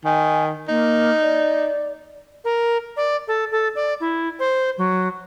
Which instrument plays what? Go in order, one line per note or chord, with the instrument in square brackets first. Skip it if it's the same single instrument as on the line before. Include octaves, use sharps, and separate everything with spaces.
[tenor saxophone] D#3 [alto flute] G#5
[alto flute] A#3 [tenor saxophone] D#4
[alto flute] D5
[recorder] A#4
D5
A4
A4
D5
E4
C5
F#3